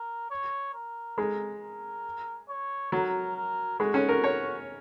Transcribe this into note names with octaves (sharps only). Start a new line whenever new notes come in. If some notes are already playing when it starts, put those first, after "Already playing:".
Already playing: A#4
C#5
A#4
G#3
A#4
C#5
F#3 A#4
A#4
G#3 F#4
C#4
A#4
C#5